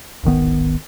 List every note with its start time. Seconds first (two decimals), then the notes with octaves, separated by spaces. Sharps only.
0.24 D1 G#1 D#3 B3